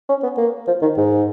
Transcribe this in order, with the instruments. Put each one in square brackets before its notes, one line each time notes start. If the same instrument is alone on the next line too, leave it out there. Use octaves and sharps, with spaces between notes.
[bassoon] C#4
B3
A#3
F3
D#3
G#2